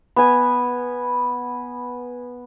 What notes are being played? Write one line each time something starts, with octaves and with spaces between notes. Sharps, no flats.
B3 G#5